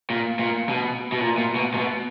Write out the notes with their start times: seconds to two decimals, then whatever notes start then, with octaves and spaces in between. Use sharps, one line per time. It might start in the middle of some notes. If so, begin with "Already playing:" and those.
0.10 A#2
0.39 A#2
0.69 B2
1.12 B2
1.20 A#2
1.38 A#2
1.56 B2
1.74 A#2
1.78 B2